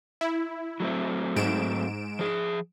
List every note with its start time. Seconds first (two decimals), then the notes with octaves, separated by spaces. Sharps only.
0.21 E4
0.80 F#3 A3 C4
1.36 G#2 D7 E7
2.19 F3 G#4